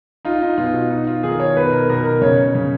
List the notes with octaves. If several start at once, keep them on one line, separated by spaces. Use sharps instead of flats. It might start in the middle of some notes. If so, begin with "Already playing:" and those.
D#4 F4
D#4
B2 F4
F#4
D#4
F4
D#3 G#4
C#5
B2 B4
A#4
B2 A#4
A#4
C#3 C#5
C#3